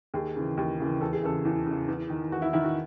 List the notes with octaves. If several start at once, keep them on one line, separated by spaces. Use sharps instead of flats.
D#2 G#4
C#3 E3
D#2
C#3 E3
E2 A4
G#4
C#3 E3 A4
E2
C#3
E3
E2
D#3
E2 F#4
E4
D#3 E4
F#4